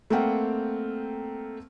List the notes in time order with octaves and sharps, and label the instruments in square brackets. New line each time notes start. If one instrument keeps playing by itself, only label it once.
[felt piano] A3 A#3 C4 A#4 F#5 G5